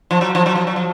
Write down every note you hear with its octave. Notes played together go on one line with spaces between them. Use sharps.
F3
F#3
F3
F#3
F3
F#3
F3